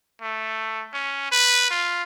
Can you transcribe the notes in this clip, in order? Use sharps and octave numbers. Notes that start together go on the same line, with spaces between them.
A3
C#4
B4
F4